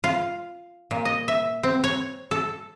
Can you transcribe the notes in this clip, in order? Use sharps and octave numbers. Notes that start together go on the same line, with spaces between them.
F4
A#2
D#5
E5
C4
C#5
A4